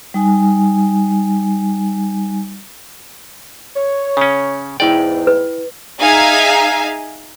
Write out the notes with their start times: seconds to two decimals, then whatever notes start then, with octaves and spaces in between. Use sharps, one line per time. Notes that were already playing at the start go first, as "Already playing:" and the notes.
0.14 G3 D#4 G#5
3.76 C#5
4.17 C#3 C#4
4.80 E2 G#2 E4 D5 G5
5.27 B4
6.00 D#4 G#4 E5 F5 G#5